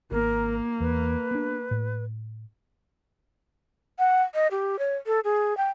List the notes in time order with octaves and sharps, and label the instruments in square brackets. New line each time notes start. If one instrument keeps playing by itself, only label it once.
[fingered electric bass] G#1 [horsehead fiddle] A#3 [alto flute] A#4
[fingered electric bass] E2 [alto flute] B4
[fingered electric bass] B3 D4
A2
[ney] F#5
D#5
G4
C#5
A4
G#4
G5